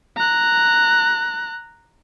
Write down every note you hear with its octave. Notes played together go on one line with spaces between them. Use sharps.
A#5 F#6